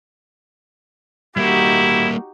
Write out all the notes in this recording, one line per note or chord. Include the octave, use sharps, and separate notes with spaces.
G3 A#3 D#4 E4 F#4 G4